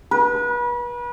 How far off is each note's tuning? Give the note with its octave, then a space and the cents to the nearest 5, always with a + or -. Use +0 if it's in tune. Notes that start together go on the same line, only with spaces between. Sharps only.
B4 -35